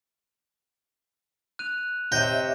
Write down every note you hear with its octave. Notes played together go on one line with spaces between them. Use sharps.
F#6 D#7 F7
C3 C#5 D#5 E5 G5 A#6